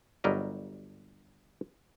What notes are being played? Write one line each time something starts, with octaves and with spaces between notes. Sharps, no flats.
G1 F#3 G3 A#4 D#5